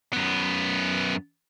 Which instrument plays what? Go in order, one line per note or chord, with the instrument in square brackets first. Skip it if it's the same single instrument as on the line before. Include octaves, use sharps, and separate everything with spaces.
[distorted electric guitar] F#2 B3